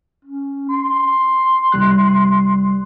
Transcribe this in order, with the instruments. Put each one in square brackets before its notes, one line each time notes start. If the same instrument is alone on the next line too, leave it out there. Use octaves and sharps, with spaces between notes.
[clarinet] C#4
C6
[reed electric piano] C2 G3 F#6